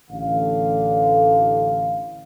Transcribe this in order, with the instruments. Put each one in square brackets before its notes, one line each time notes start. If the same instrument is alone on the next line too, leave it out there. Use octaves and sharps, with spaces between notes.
[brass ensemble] A1 D3 F5